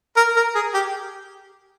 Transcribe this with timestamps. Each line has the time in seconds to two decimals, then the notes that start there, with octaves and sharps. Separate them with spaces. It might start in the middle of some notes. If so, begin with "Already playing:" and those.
0.16 A#4
0.36 A#4
0.55 G#4
0.74 G4